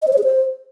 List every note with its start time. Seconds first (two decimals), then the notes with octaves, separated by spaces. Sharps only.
0.02 D#5
0.07 C5
0.13 C#5
0.18 G#4
0.23 C5